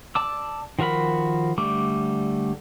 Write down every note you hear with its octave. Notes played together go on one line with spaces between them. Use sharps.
D5 A5 D6 E6
D#3 F3 F#4 A#4 B5
D3 G3 A3 D6